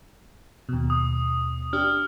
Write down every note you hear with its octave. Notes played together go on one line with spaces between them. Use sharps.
D#2 B2
D#6
D4 G4 F6